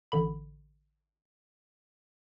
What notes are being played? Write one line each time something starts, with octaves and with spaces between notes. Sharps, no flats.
A1 D3 B5